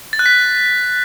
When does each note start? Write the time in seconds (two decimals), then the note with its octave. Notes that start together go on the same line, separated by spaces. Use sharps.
0.13 A6
0.19 F#6
0.26 B6